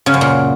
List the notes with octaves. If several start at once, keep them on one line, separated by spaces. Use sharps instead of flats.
C#3
F#2
A#2